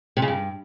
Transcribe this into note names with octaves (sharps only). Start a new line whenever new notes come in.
C3
C#3
G2